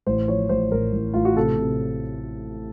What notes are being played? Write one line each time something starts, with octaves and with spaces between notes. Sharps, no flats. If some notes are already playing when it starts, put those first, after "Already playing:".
A1 C5
F3 C#5
A1 C5
A1 A#4
A1
A1 F4
F#4
C3 A4
C3